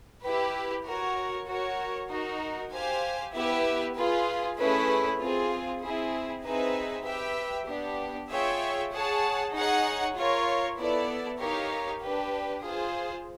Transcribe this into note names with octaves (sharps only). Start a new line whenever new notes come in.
E4 G4 B4
F#4 A#4 C#5
F#4 A#4 C#5
D#4 F#4 A#4
G4 C5 F5 G#5
B3 E4 G4 B4 E5
F4 G#4 B4
A3 C#4 E4 G#4 B4
C4 F4 G#4
C4 E4 G#4
C4 D#4 G#4 B4 E5
G4 B4 E5 G5
B3 D4 G4
F4 G#4 C#5 E5 G5
G#4 C#5 F#5 A5
D#4 G#4 C#5 F#5
F4 A#4 C#5
B3 E4 A4 D5
D#4 G4 A#4 C#5 F5
D4 G4 B4
F4 G#4 C5